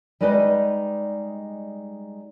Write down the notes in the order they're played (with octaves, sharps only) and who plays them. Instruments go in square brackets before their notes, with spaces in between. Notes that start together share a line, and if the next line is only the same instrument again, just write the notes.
[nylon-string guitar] G3 G#3 D#4 B4 D5 D#5